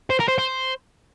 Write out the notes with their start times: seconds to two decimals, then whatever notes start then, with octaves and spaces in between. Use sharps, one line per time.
0.10 C5
0.20 A#4
0.28 C5
0.38 C5